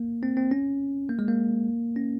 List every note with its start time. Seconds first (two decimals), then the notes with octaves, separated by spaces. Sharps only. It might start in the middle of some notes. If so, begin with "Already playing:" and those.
Already playing: A#3
0.23 C4
0.37 C4
0.51 C#4
1.09 A#3
1.19 G#3
1.28 A#3
1.96 C#4